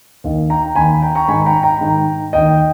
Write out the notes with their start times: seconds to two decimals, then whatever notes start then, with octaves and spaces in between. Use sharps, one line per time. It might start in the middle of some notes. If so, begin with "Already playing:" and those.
0.24 D#2 D#3
0.50 G5 A#5
0.75 D#2 D#3 G#5 B5
1.02 G5 A#5
1.15 A#5 C#6
1.28 G#2 D#3 G#5 B5
1.46 G5 A#5
1.63 G5 A#5
1.81 G#2 D#3
2.33 D#2 D#3 D#5 G5